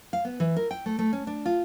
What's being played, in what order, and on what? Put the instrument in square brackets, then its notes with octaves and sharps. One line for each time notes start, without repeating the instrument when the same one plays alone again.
[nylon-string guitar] F5
B3
E3
A#4
G5
A3
A3
C#4
D4
F4